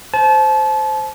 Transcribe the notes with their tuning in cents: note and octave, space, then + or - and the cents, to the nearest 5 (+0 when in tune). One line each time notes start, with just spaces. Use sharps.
C5 +0 A5 -30